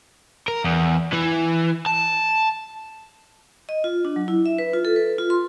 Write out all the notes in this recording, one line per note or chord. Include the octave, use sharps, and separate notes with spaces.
A#4
E2
E3
A5
D#5
F4
D4
F#3
E4
E5
B4
F4
A4
B4
F4
C6